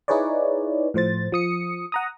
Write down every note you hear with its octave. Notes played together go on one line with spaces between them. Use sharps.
D#4 E4 G#4 B4 C#5 D5
A2 F3 C5 A6
F3 D#6 C#7
F#5 A#5 D#6